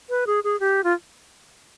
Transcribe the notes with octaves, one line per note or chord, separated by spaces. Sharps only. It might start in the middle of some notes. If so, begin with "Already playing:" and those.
B4
G#4
G#4
G4
F4